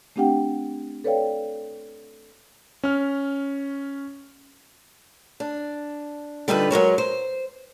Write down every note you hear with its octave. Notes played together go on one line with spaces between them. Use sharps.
A3 C4 D4 G4 F#5 G5
A4 B4 C#5 D5 F5 G5
C#4 F6
D4
D3 G3 D#4 F4 A#4 B4
F#3 G#3 A#4 C#5
C5